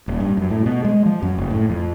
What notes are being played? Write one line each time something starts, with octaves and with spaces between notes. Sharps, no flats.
D#1
G2
F#2
A2
B2
G#3
F3
F#2
F#1
A2
F2